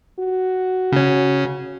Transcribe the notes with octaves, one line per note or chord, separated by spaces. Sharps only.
F#4
C#3 C#4